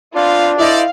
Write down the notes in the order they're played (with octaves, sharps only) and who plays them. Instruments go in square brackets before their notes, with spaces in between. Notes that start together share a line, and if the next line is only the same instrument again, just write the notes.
[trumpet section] B3 C4 F5 [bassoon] D4 [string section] F4
[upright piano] E4 D#5 [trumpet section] A4 C5 D5 [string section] F5